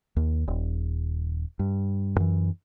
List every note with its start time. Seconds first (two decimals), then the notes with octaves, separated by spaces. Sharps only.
0.16 D#2
0.48 D#1
1.59 G2
2.16 F#2 E3